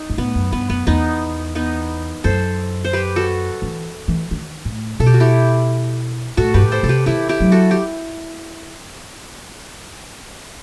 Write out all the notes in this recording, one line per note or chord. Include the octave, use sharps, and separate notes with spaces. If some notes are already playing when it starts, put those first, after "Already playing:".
Already playing: D#4
G2
A2 B3
F#2
G2 B3
F#2 B3
E2 B3 D#4
B3 D#4
F#2 A4 C5
C5
G4 B4
F#4 A4
E3
E3
D#3
A2
B2 A4
G4
F#4
E4 G4
A2 F#4 A4
G2 G4 B4
A2
A4 C5
C3 A4
G4 B4
D#3 E4 G4
E4 G4
F#3
F#4 A4
G4